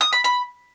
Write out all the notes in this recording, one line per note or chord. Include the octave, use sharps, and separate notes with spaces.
D#6
B5
B5